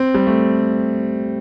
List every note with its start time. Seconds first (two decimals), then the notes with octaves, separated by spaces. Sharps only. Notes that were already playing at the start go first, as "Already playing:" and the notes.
Already playing: C4
0.15 G3
0.27 A3